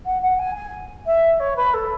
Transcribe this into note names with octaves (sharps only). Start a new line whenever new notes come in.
F#5
F#5
G#5
G#5
E5
C#5
B4
A4